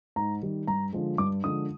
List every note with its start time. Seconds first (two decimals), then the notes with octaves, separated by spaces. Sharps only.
0.16 G#2 A#5
0.42 D#3 G3
0.67 G2 A#5
0.93 D3 F3 G#3
1.18 G2 D6
1.44 D3 F3 G#3 D#6